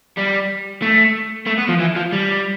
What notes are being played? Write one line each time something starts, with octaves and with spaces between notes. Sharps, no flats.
G3
A3
A3
B3
F3
E3
F3
G3